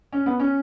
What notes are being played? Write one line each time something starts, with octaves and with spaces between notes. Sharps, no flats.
C#4
B3
C#4